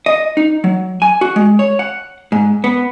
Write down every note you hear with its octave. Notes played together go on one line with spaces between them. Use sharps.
D#5
D#4
F#3
G#5
F#4
G#3
C#5
F#5
G#2
B3